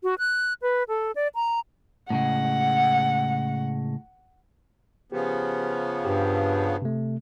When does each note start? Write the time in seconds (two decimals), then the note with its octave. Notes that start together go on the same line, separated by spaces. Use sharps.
0.03 F#4
0.19 F#6
0.62 B4
0.88 A4
1.15 D5
1.35 A#5
2.10 A2 C#3 G#3 F#5
5.12 C#3 F3 B3 G4
6.05 G2 G4
6.82 C3 A3